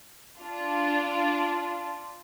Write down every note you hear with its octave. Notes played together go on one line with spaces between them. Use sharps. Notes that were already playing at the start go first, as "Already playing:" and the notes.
D4 F4